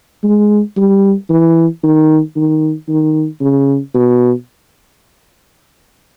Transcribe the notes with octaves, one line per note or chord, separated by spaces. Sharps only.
G#3
G3
E3
D#3
D#3
D#3
C#3
B2